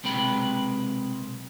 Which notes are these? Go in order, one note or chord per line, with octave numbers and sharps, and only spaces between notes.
B1 C3 G#3 B4 G5 B5